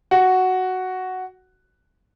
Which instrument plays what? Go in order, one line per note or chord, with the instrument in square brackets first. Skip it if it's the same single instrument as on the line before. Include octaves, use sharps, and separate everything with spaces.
[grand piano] F#4